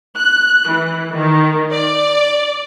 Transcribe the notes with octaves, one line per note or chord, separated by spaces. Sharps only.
F#6
E3
D#3
D5